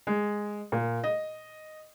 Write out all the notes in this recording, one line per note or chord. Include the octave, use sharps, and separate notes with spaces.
G#3
A#2
D#5